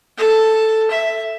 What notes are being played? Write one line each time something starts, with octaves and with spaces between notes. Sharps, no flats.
A4
E5